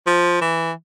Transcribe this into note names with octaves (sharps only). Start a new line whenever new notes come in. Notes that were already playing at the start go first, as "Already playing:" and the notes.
F3
E3